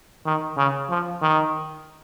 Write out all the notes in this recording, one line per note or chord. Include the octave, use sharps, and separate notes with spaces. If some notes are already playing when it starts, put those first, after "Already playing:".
D#3
C#3
F3
D#3